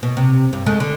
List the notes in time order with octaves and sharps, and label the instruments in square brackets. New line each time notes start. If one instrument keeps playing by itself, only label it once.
[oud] B2
C3
G2
G#3 A3
D3